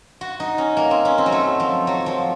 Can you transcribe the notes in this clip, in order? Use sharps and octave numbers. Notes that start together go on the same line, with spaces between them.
F#4
D#4
C#4
A#3
C4
C#4
C4
F#3
A3
F3
F#3
F3